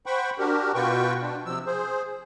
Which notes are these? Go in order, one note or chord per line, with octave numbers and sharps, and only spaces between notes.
C5 F#5 G5 B5 C#6
D4 F#4 G4 A#4
B2 F4 F#4 B4 G5 C#6
D4
C3 F3 E6
G#4 C5